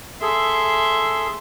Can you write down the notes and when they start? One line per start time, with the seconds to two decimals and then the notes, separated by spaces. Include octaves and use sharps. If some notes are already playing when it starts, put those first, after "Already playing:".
0.22 G#4 A4 E5 C6